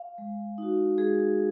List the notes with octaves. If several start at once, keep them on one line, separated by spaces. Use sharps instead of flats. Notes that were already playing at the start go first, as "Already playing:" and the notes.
Already playing: F5
G#3
D#4 F#4
G#3 G#4